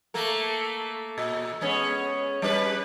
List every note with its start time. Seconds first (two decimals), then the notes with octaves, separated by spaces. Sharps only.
0.14 A3 A#3 A#4
1.18 A#2
1.61 G#3 B3 C#4
2.42 G3 C#4 B4